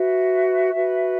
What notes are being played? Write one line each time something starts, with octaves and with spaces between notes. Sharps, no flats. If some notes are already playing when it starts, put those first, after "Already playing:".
Already playing: F#4 B4 E5
F#4 B4